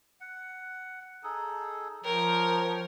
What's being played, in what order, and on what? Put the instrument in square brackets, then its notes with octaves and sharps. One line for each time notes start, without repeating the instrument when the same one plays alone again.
[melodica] F#5
D#4 G#4 A4
[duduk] F3 [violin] A#4 [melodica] C#5 G5